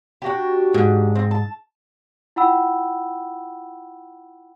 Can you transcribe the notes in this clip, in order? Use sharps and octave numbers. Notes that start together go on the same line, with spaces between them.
D4 F#4 G4
G#2
C4
A5
E4 F4 F#5 G5 B5 E6